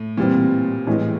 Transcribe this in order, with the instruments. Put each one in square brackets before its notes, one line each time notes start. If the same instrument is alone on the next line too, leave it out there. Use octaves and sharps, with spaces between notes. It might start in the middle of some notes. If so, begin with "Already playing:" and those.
Already playing: [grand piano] A2
[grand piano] A#2 [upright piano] E3 G3 C4
[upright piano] A2 E3 G#3